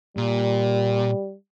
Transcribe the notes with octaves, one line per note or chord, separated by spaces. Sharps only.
A#2 G3